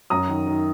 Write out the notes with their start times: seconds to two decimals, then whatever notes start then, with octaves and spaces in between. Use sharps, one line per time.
0.10 F#2 A#5 D#6
0.29 D#3
0.47 D#3